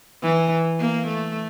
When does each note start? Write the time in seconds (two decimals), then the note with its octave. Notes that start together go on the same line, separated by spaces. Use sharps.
0.23 E3
0.80 A#3
1.07 A3